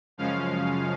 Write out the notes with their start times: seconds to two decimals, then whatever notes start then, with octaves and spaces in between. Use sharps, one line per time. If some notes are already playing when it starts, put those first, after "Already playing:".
0.18 F#2 C#3 F3 G#3 C#4 F5